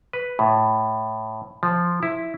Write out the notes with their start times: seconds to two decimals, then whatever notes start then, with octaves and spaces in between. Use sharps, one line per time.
0.13 B4
0.39 A2
1.63 F3
2.03 E4